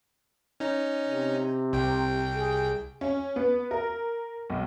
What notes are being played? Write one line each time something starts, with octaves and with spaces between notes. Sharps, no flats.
C#4 D#4
C3
C2 G5
G#4
C#4
B3
A#4
B1